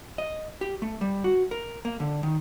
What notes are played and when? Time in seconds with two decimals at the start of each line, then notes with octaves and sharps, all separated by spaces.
0.18 D#5
0.61 G4
0.82 A3
1.01 G3
1.24 F#4
1.51 A#4
1.85 A#3
2.00 D3
2.23 D#3